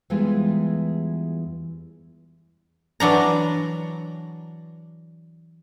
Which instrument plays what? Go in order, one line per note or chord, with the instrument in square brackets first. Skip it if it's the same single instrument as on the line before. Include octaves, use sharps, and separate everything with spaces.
[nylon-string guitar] E2 E3 G3 G#3 F4 B4
[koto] E3 F#3 D4 A#5